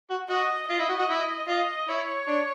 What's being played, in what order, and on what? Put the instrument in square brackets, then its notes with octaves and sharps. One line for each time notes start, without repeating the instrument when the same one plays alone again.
[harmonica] F#4
[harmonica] F#4 [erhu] D#5
[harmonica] F4 [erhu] D#5
[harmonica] E4
F#4
F#4
E4
[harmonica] F4 [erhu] D#5
[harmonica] E4 [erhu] C#5
[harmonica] D4